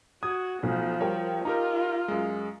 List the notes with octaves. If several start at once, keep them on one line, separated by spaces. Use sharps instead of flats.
F#4 D#6 G#6
B1 F3 A3
G3 A#4 C#5 G5
D#4 F4 G4 A#4 A#5
F#2 G#3